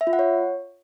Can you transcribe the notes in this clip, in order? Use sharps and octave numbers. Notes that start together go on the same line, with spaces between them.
E5
F4
F#5
C#5